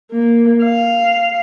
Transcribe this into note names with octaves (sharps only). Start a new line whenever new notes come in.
A#3
F5